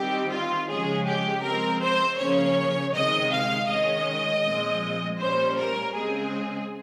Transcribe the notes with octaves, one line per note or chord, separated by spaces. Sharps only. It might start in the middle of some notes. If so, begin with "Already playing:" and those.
Already playing: D#3 G3 C4 G4
F4
C#3 F3 G#3 C#4 G#4
G4
F3 G#3 C4 A#4
C5
C#3 F3 A#3 C#4 C#5
C3 D#3 G#3 D#5
F5
D#3 G#3 C#4 D#5
A#2 F3 G#3 C4
A#2 G3 A#3 C#4 C5
A#4
C#3 G#3 C4 G#4